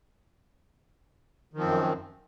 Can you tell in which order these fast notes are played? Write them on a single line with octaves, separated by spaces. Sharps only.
D#3 F3 C4 F#2